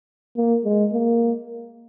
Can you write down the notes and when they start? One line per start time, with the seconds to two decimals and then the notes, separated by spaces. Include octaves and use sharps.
0.36 A#3
0.64 G#3
0.93 A#3